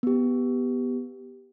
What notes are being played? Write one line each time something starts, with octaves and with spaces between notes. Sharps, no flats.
B3 G4